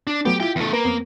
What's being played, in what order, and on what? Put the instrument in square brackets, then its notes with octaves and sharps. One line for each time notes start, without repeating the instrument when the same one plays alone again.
[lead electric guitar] D4
[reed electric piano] F#3 A3 B3 [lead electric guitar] G4
[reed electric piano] E4 F4 [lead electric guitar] G4 G5
[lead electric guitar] E2 A3
[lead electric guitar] A#3 [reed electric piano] A#4 B4
[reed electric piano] F2 B3 C4